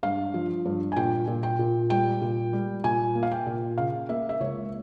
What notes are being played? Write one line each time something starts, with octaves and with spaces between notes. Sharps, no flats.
G2 F5
F3
G2
G#5
A#2 G5
A#2
G5
A#2
G3 G5
A#2
G3
A#2 G#5
A#3
F5
G5
A#2
C#3 F5
A#3 E5
E5
C#2 C#5